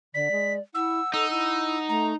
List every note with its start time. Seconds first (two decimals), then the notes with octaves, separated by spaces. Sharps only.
0.14 D3 D5 B6
0.31 G#3
0.74 E4 F#5 E6
1.14 D#4 A4 E6
1.31 E4 E6
1.89 A3 A#5